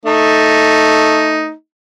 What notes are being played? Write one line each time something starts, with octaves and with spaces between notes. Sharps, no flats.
A3 D#4